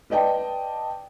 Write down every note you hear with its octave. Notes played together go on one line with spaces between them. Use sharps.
B4 D5 D#5 G5 A5